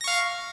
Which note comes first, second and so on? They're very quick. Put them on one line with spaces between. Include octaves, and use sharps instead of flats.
A#6 C#6 F5